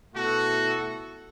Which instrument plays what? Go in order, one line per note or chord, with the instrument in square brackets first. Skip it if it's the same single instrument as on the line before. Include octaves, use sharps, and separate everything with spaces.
[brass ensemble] B2 A3 E4 A4 [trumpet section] F#4